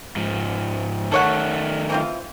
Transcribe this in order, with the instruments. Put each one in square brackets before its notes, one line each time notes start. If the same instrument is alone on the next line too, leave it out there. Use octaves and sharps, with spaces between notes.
[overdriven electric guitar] G#2 F3
[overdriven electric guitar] D#3 A3 [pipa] A4 C#5 F#5
[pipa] E3 C4 F4